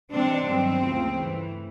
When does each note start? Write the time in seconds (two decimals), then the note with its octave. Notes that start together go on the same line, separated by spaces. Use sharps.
0.10 C3 E3 G#3 C4 D4
0.45 G2 D#3 F#3 B3 C4
0.81 D2 C#3 F3 A#3
1.15 G2 E3 A3